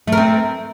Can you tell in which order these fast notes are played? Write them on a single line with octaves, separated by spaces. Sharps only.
A3 A#4 C4